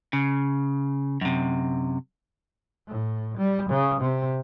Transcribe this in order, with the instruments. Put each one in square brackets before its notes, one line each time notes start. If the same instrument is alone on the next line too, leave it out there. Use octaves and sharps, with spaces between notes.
[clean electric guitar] C#3
F#2 C3
[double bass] A2
G3
C#3
C3